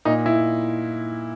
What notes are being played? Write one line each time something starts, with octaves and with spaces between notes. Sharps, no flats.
A#2 D#4
E4